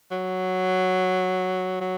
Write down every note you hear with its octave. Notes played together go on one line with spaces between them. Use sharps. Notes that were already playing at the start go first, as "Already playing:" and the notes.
F#3
F#3